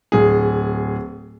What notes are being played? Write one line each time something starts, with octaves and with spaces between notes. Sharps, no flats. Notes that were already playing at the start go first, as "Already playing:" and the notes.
D1 G#4